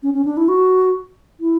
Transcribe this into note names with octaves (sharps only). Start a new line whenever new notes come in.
C#4
C#4
D4
E4
F#4
E4